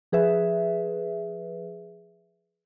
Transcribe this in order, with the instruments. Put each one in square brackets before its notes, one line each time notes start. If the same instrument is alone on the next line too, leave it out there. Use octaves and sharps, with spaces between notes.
[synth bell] F3 G#4 B4 E5